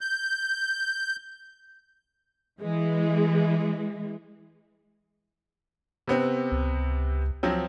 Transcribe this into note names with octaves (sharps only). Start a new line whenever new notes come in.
G6
E3 G#3
C3 B3 C4
C#2
F3 F#3 C4